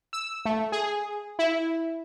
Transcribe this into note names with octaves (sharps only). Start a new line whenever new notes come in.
E6
A3
G#4
E4